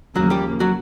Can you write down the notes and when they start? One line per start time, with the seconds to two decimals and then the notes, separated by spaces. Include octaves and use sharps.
0.15 D#2 C#3 F3 F#3 A#3 F#4
0.30 G3 G4
0.60 F#3 F#4